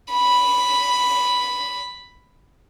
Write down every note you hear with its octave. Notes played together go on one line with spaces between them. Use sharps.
B5